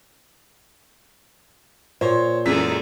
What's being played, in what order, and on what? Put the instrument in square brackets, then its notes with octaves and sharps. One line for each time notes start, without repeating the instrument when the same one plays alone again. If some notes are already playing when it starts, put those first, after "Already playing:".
[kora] A#2 [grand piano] C5 C#5
[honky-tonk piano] F#2 E3 [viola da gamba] G#3 G#4 A4 [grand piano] E6 B6